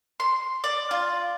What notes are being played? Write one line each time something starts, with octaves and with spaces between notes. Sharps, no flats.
C6
D5
F4